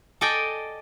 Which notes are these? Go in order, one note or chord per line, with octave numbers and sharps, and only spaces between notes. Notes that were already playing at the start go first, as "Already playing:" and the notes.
A4 D5 D#5 G5 G#5